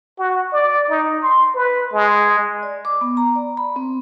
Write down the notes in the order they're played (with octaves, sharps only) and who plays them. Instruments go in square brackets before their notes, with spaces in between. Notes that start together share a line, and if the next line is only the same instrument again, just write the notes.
[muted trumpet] F#4
D5
D#4
C6
B4
G#3
[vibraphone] D5
D6
B3
A#5
D5
B5
C4